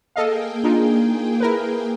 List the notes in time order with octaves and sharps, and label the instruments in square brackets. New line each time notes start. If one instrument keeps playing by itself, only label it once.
[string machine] A#3 G#4 G5 [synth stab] A4 D#5 F5
[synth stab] D4 D#4 F4
E4 A#4 B4